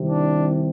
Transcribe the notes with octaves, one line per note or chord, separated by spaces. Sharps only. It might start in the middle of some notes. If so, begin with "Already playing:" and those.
Already playing: C2 C3 D#3
D4